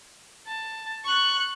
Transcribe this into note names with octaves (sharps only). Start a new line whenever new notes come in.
A5
C#6 F#6